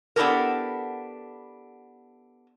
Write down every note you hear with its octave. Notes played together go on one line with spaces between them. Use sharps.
B3 D4 E4 G4 A4 A#4